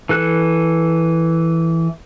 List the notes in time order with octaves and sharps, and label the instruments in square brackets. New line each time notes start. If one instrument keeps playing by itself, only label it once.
[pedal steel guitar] E3 A4 F#6